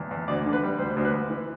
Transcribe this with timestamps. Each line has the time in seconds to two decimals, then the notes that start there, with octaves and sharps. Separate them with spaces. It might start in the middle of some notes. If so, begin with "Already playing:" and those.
Already playing: E2
0.11 E2
0.28 D2 D5
0.45 D3
0.53 B4
0.62 G3
0.79 D2 C5
0.96 D2
1.05 B4
1.14 D2
1.30 E3